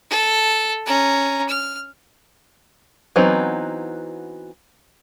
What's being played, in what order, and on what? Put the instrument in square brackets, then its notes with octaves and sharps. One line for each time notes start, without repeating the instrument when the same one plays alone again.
[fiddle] A4
C#4 A#5
F6
[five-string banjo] E3 F#3 B3 C4 D#4